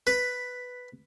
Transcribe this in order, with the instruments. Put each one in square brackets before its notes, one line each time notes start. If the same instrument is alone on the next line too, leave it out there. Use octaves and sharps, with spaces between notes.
[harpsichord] B4